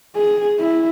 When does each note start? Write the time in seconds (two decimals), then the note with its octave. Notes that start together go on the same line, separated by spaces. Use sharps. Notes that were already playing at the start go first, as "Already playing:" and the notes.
0.16 G#4
0.59 E4